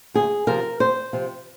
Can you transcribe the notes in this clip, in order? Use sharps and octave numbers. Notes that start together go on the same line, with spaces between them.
D2 G#4
C3 F3 A#4
D2 C5
C3 F3